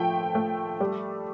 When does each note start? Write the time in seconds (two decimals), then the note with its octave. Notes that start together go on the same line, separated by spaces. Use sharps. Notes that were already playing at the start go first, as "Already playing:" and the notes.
Already playing: F3 A3 G5
0.35 A3
0.80 G3